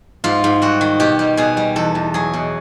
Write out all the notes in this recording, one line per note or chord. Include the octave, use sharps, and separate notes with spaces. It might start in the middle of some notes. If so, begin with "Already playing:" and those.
G#2 F4
G#2
G3 F#4
D#3
B2 G4
G3
B2 G#4
G3
E2 A4
E2
F#3 G#4
B2